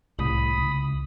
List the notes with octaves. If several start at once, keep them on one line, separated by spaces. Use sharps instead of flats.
C2 A2 B5 D#6
C#2